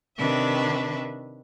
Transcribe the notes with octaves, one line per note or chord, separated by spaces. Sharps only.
C3 D#3 D4 B4 E5